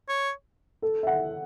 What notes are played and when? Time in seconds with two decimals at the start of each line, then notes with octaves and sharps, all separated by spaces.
0.08 C#5
0.82 A4
1.03 E5
1.07 F#5